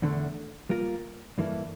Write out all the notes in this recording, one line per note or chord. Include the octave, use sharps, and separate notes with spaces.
E2 D3 A3
G3 A#3 F4 A#4
G2 E3 A#3 E4 A4